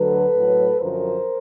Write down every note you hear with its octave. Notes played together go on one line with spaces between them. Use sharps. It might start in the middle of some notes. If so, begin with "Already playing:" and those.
Already playing: D2 D3 F#3 A4 B4
A2 F#3
F#2 D3 F3 A#4 C5